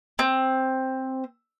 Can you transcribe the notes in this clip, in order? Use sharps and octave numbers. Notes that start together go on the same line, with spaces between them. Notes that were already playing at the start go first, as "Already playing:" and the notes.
C4